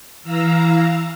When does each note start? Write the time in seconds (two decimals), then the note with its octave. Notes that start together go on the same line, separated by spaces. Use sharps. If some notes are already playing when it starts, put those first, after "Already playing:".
0.23 E3 F5 A#5 E6